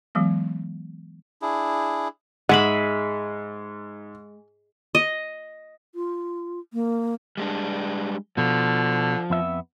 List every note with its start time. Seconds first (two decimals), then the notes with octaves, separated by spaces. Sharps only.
0.15 E3 F#3 G#3 B3
1.42 D4 E4 G#4
2.49 G#2 G#3 E5 F#5 B5
4.95 D#5
5.95 F4
6.73 A#3
7.37 G3 G#3 D4
8.37 B2 D3 F3
9.30 F2 B3 E5